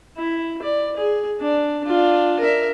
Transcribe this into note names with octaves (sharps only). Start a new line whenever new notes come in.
E4
D5
G#4
D4
D4 F4
A#4 E5